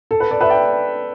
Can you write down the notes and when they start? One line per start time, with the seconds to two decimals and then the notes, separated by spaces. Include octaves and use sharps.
0.11 A4
0.20 B4
0.30 A4 D5
0.41 B4 E5
0.49 D5 G5